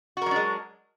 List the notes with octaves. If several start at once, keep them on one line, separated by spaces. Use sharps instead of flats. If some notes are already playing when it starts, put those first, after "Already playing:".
F#3 G#3 D4 F#4 A#4